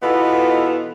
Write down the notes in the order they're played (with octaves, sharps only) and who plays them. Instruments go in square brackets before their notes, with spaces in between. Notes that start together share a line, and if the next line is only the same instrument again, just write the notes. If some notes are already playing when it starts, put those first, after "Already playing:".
[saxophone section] B2 E3 B3 D#4 F4 A4